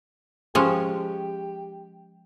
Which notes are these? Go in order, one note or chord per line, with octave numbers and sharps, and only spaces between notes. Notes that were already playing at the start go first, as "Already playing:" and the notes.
F3 G#3 C#4 G4